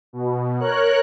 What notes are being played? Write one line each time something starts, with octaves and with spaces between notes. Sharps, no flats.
B2
A#4 C#5 F#6